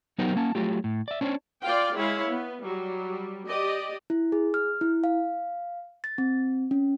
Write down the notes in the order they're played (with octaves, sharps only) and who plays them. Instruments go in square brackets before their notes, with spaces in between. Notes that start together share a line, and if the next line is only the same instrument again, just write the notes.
[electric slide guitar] F#3 B3 D#4 G4 A#4 C5
A#3 C#4 A5
F#3 A3 F4 G4
A2
D5 E5
C#4 D4 C5 C#5
[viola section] F4 D5 F5 G5
G#3 E4 C#5 F5
B3
F#3 G3
G4 D5 D#5
[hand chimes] E4
G#4
F6
E4
F5
A6
C4
C#4